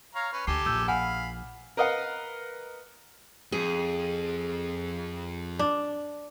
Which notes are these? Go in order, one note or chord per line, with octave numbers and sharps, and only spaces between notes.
C#5 F5 A#5
C#4 B4
D2 D4 G4 A4 G#5 C7
A#1 A#2 E6 G6
F5 F#5 G#5 B5
A#4 B4 D#5 F5 F#5
F2 G#4
D4